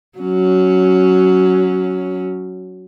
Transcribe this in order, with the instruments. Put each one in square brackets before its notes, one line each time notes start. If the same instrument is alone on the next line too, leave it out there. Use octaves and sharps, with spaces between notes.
[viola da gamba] F#3 C#4